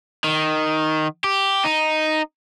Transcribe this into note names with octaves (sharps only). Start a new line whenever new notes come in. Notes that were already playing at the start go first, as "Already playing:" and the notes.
D#3
G4
D#4